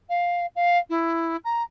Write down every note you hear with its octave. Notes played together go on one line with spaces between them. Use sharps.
F5
F5
E4
A#5